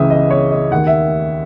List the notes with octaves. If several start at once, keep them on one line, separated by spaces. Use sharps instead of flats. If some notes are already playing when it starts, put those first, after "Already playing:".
Already playing: C#2 C#3 E3 E5 D#6
D#5
C#5
D#5
D#2 D#3 F#5
E5